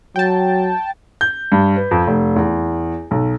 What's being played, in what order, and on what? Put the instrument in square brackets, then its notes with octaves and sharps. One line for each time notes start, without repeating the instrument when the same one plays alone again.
[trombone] F#3 [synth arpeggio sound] G5 A5
[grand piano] G6
G2
B4
F2
F1
E2
B1